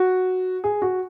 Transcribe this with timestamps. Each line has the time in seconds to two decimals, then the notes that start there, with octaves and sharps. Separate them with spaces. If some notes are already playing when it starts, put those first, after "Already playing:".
Already playing: F#4
0.64 G#4
0.82 F#4